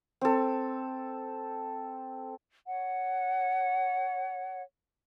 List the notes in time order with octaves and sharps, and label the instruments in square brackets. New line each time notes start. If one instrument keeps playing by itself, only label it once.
[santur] C4 A4
[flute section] C#5 F#5